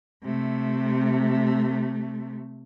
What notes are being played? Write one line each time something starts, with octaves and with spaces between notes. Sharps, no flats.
C3 A3